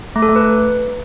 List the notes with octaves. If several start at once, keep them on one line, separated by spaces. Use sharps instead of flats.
A3
A4
A3
B4